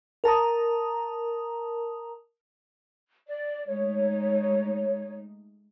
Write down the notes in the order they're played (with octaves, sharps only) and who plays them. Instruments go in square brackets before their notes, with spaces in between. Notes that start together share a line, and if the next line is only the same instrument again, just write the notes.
[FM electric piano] A#4 A5 A#5 D#6
[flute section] D5
[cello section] G#3 A3 D#4 [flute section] C#5